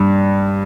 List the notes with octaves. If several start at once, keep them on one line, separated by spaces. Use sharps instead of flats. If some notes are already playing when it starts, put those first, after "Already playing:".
Already playing: G2 G3